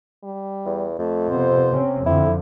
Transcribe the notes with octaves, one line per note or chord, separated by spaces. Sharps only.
G3
E2
F2 A3
C3 B3 C5
C3 C4 C#4
F2 D3 F3 C4 E4